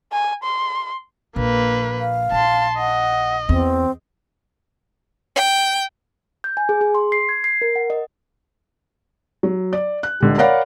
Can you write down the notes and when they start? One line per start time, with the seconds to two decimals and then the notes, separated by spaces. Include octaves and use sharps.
0.13 G#5
0.44 C6
1.36 A#1 A#3 B4
1.99 F5
2.32 A#1 A5 C6
2.78 D#5 F#5
3.49 E2 C4
5.36 G5
6.44 G6
6.57 G#5
6.69 G#4
6.81 G#4
6.95 C6
7.12 C7
7.29 G#6
7.44 C7
7.62 A#4
7.76 F#5
7.90 D#5
9.43 F#3
9.73 D5
10.03 F#6
10.20 C#2 D3 G3
10.38 A#4 C#5 D5 F5 F#5 B5